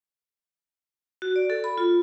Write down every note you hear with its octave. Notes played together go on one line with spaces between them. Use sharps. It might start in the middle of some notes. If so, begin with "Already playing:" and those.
F#4
D5
A4
B5
F4